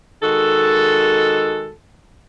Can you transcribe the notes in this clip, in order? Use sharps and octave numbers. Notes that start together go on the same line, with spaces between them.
D#3 G#3 F#4 A4